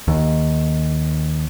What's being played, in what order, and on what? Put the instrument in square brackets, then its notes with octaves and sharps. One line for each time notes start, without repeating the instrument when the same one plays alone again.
[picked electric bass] D#2